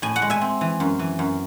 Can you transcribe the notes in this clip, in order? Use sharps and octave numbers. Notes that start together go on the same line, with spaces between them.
A2 G#5
F#5
G#3
E5 G#5
C4
E3
F#2
E3
F#2